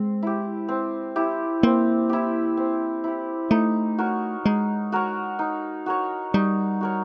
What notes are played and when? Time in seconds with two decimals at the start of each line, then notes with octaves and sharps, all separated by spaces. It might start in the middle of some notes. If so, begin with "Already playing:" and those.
Already playing: G#3 C4
0.22 E4 G4
0.68 C4
1.16 E4 G4
1.63 A#3 C4
2.10 E4 G4
2.57 C4
3.04 E4 G4
3.51 A3 D#4
3.98 F#4 A#4 C#5
4.45 G#3 D#4
4.92 F#4 A#4 C#5
5.39 D#4
5.86 F#4 A#4 C#5
6.34 G3 D#4
6.81 F#4 A#4 C#5